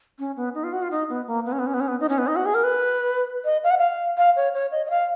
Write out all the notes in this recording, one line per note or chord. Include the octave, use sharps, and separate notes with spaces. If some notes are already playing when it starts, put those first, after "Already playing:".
C#4
B3
D#4
F4
F#4
F4
D#4
B3
A#3
B3
C#4
B3
C#4
B3
C#4
B3
D#4
C#4
B3
D#4
F#4
G#4
A#4
B4
D#5
F5
F#5
F5
F5
C#5
C#5
D#5
D#5
F5